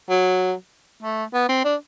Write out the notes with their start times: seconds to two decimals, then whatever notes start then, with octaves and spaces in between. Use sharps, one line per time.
0.10 F#3
1.03 A3
1.34 B3
1.49 C4
1.65 D4